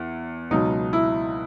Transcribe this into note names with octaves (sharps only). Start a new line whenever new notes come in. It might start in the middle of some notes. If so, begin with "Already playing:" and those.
Already playing: E2
C#2 B2 F#3 D#4
E4